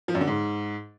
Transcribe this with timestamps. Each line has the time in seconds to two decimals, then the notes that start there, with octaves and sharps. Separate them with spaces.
0.08 F3
0.15 F#2
0.21 D3
0.27 G#2